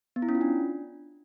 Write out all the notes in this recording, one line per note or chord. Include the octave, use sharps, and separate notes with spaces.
B3
E4
C#4
F4
D4